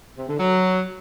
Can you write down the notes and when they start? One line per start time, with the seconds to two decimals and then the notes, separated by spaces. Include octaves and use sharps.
0.17 C3
0.28 D3
0.39 F#3